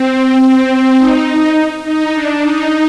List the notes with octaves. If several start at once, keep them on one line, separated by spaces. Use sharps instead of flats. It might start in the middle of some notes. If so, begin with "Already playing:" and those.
Already playing: C4
C4
D#4
D#4
D#4
D4
D#4